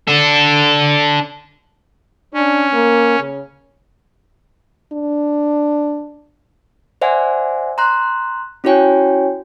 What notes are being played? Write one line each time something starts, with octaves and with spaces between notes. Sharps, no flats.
D4 A4
C#4 D4
A#3
C#3
D4
C5 D5 E5 F#5 G#5
A#5 C6 F#6
C#4 E4 F#4 C#5 G5 G#5